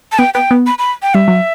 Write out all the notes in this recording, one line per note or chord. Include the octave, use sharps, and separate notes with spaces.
A5
B3 G5
B3 G5
B3
B5
B5
G5
G3 E5
F#3